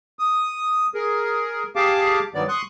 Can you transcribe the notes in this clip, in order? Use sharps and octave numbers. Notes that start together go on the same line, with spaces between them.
D#6
G#4 A#4
G4 G#4 F5 A5 D6
G2 D#3 F#3 B3 D5
C6 C#6 D#6 F#6